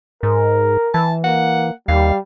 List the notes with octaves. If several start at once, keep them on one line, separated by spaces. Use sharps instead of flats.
G#2 A#4
E3 A5
A#3 F#5
D#2 G3 F5